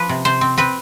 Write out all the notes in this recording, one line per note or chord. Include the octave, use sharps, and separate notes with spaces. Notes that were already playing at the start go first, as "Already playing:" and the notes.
Already playing: F3 B4
C3
C3 C5
C4
C4 B4